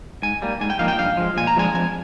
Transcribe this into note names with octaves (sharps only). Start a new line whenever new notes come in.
G#2 G#5
G3 A#3
G#2 G#5
G5
F3 A#3 D#4 F5
G5
G2 F5
F3 G#3
A#2 G#5
A#5
F3 G#3 D4 F4 G#5
F2 G#5